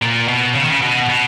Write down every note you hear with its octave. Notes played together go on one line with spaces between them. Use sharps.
A#2
B2
C#3
D#3
C#3
B2
B2